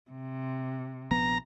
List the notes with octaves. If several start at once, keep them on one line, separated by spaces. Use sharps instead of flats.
C3
A#1 F3 B3 A#5